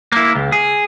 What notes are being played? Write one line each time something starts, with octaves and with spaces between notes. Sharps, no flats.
A#3 E4
C#2
G#4